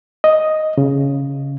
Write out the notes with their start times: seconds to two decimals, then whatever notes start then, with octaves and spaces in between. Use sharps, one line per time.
0.24 D#5
0.78 C#3